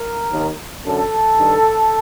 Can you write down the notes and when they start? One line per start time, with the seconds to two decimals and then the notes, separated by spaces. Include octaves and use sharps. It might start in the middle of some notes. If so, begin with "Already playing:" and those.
Already playing: A#4
0.31 D#2 D#3
0.84 F#2 D3 A4
1.36 G2 D#3